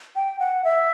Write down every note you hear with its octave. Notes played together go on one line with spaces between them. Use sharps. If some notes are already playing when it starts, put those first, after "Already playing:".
G5
F#5
E5